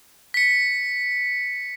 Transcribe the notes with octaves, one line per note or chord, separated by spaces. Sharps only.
B6 C#7